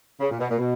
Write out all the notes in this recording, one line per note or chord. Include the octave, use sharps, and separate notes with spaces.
C#3
A#2
B2
A#2
B2